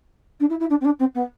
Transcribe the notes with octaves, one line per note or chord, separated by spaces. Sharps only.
D4
E4
E4
D4
C4
D4
C4
B3